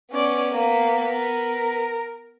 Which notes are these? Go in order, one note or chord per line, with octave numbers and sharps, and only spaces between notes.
B3 C#4 B4 D5
A#3
A#4